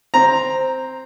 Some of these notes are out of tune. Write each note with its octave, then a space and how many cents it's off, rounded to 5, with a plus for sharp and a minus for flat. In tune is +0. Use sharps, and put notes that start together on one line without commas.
C4 +0 A#5 +0